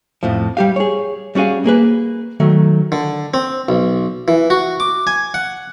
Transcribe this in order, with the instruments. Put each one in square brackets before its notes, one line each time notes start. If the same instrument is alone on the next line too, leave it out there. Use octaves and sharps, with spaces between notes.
[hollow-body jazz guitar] F2 A2 F3
G3 G4 F5
G#4 C#5
G3 C#4 F#4 G#4 F5
A#3 G#4 B4
D#3 F#3 A3
[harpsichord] D3
C4
B1
E3
F#4
D6
G#5
F#5